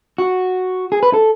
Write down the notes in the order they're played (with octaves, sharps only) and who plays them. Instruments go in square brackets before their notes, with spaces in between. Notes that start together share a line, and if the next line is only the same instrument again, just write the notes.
[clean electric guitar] F#4
G#4
B4
A4